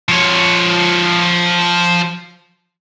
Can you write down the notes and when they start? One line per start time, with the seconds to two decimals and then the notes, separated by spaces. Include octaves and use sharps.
0.09 F3 C#5